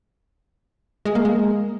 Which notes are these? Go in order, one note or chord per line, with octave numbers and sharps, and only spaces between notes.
G#3
A#3
G#3